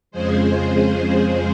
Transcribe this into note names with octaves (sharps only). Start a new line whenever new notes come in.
F2 C#3 F3 G#3 G#4 C5